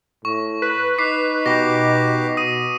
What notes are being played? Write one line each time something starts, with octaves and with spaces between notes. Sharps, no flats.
A2 C#6
B4
D#4 D6 B6 C7
B2 G4 B4 D6 A#6
D#6 D#7